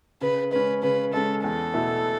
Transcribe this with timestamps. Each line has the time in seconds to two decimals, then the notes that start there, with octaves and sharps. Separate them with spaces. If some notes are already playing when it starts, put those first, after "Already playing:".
0.21 C#3 B4
0.51 G#3 C#4 B4
0.83 C#3 B4
1.13 G#3 C#4 A4
1.44 E2 A4
1.74 B2 A3 E4